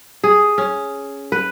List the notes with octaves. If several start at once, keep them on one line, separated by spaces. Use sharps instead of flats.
G#4
C#4
B4